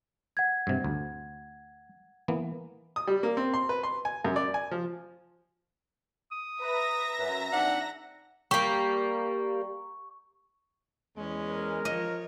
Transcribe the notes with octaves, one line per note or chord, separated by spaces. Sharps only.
F#5 G#6
G2 C3
D2
E3 A#3 B3
D#6
G3
A#3
C4
C6
B4
C6
G#5
F#2
D5
G#5
F3
D#6
B4 E5 A#5 A#6
F#2 B4
A#1 C4 D4 D#4 F#5
G3 A#3 C#6
E2 G#3 C#4
A#4
F3 C#5 D#5